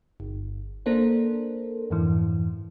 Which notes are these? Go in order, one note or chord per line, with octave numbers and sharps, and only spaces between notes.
G1
A#3 D4 A4 A#4 C5
F2 G#2 E3